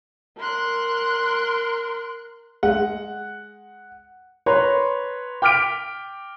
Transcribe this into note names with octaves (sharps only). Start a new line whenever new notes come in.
A#4 C6 F#6
G#3 F#5
B4 C#5 A#5 C6
G5 D6 F6 B6 D7